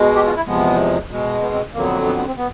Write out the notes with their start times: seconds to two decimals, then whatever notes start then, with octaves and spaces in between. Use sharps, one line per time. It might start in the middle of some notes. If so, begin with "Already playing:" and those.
Already playing: B2 G#3
0.15 G4
0.26 F4
0.36 E4
0.47 E2 C3 F3 G#3 B3
1.11 B2 G#3
1.42 B3
1.53 C4
1.74 F2 D3 F#3 A#3
1.84 B3
1.93 A#3
2.06 B3
2.16 B3
2.27 C4
2.38 B3